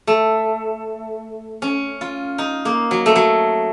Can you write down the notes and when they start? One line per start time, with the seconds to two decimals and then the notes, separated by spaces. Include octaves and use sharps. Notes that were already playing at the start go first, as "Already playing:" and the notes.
0.07 A3
1.62 C#4
2.01 F4
2.38 D#4
2.65 A#3
2.91 F#3
3.06 A3
3.16 F#3